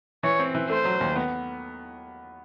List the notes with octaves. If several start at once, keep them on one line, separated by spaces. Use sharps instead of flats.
E3 C#5
C4
E3
A3 C5
F#3
D#2
B3